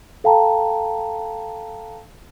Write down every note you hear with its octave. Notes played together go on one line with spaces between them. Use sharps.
A4 F5 G5 A5 A#5